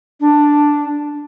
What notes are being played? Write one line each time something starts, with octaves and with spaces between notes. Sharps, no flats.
D4